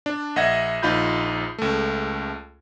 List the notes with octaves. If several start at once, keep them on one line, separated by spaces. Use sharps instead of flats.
D4
A#1 D#5 E5 F#5 G#6 A#6
A#1 D#4 F4 B5 G6
C#2 A3